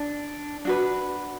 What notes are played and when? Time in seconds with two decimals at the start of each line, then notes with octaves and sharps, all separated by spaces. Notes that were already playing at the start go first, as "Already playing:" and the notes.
Already playing: D4
0.65 D4 F#4 B4